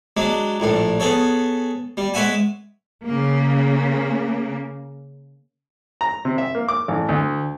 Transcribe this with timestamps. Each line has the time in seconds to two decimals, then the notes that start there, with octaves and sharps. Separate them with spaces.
0.17 F#3 G#3 D4
0.60 A#1 A2 D4
1.00 B3 G#4 A4 C#5
1.97 G3
2.14 G#3 B4 C#5 E5 F#5 G#5
3.05 C#3 A#3
6.01 A#5
6.25 C3
6.38 E5
6.55 A#3
6.68 D6
6.88 A1
7.09 D2